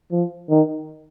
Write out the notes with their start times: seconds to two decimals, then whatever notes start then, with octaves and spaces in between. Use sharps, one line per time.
0.11 F3
0.50 D#3